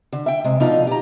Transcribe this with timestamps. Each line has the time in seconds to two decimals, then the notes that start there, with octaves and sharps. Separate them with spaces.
0.13 D3
0.26 E5 G5
0.44 C3 G#3
0.60 B2 D3 F3 D#4 F4
0.87 G4 A#5